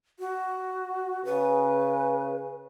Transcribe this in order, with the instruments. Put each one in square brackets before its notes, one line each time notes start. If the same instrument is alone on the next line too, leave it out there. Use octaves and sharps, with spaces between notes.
[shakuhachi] F#4
[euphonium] C#3 [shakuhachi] B4